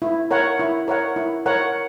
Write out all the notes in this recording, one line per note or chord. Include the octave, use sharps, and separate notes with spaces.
E4
A#4 C#5 F#5
E4
A#4 C#5 F#5
E4
A#4 C#5 F#5